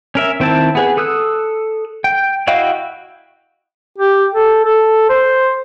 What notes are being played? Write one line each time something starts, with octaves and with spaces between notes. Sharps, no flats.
C#4 A#4 E5
D#3 C4 E4 A5
B3 G#4 B4
A4 D#6 E6 F#6
G5
E4 F#4 D#5 F5 G5
G4
A4
A4
C5